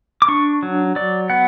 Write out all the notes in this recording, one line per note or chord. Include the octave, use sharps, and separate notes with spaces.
D6
D4 C#6
F#3
F#3 D5
B3 F#5